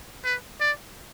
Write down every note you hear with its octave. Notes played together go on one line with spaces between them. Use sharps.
B4
D5